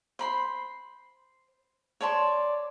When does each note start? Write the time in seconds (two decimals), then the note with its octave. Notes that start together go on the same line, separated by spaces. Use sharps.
0.19 C5 B5 C6
2.01 C#5 D5 A5 C6